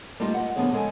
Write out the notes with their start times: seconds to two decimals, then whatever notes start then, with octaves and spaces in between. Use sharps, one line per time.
0.20 G3 A3 A#3 D#4 F4 G4
0.34 D#5 F#5
0.56 D3 F3 B3 D4 G#4 C#5
0.73 C#3 G#3 A4 G#5